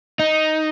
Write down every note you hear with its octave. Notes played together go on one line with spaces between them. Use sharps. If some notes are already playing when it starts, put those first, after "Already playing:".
D#4